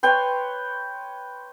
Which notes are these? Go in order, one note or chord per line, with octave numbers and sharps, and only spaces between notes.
B4 C#5 G5 C6